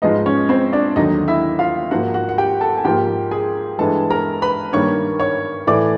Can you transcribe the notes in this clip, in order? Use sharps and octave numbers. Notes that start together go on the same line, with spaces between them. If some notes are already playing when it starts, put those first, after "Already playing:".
G#2 F3 G#3 B3 D#4 D#5
C#4 C#5
C4 C5
D4 D5
D#2 D3 F#3 D#4 D#5
E4 E5
F4 F5
G#2 F3 A#3 F#4 F#5
F#4 F#5
F#5
G4 G5
A4 A5
G#5
G#2 F3 A#3 G4 G5
G#4 G#5
G2 E3 G#3 B3 A4 A5
A#4 A#5
B4 B5
G2 D#3 G3 A#3 C#5 C#6
C#5 C#6
A2 E3 A3 D5 D6